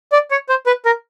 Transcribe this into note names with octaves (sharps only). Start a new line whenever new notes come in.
D5
C#5
C5
B4
A#4